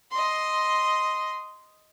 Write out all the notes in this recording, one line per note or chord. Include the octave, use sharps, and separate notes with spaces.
D#5 C6